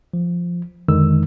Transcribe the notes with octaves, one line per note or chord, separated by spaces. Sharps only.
F3
F2 D3 D#3 G#3 E6